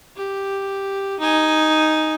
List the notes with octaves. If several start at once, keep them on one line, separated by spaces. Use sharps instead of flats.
G4
D#4 G#5